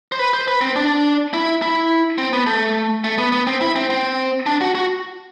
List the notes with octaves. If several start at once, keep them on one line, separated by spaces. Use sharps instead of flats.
C5
B4
C5
B4
C4
D4
E4
E4
C4
B3
A3
A3
B3
B3
C4
E4
C4
C4
D4
F#4
F#4